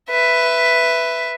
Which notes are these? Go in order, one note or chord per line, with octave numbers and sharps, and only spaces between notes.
B4 E5